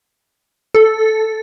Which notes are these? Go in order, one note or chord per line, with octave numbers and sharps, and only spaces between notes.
A4